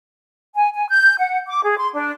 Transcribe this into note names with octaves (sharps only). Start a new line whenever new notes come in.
G#5
G#5
G6
F#5
D6
G#4
C6
D4